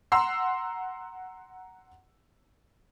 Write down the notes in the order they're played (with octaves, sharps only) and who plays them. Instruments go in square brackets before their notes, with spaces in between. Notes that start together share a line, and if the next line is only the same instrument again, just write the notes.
[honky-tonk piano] F#5 A#5 C6 E6 C7